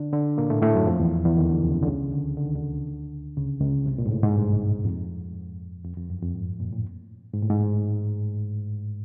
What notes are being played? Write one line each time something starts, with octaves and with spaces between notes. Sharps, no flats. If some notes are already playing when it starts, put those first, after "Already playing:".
Already playing: D3 D4
D3 D4
A#2 A#3
A2 A3
A2 A3
F#2 F#3
F2 F3
E2 E3
E2 E3
D#2 D#3
D2 D3
C#2 C#3
C2 C3
D3
C#2 C#3
D2 D3
D3
D#3
D2 D3
C#2 C#3
C#2 C#3
C2 C3
A#2
G#2
A2
G#2
G2
F2
F2
F2
F#2
F2
G#2
A#2
A2
G#2
A2
G#2